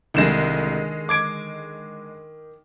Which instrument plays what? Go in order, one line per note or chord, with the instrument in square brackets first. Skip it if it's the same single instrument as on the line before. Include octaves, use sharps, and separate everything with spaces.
[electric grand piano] C2 E7 [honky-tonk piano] D3 G#3 [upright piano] D#3
[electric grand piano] D6 G#6 D7